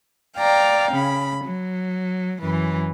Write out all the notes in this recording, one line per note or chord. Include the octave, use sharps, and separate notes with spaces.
D5 F5 G5 A#5
C#3 B5
F#3
F#2 E3